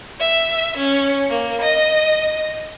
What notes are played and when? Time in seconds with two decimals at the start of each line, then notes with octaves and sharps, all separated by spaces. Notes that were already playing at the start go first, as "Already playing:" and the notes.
0.20 E5
0.77 C#4
1.30 A#3
1.62 D#5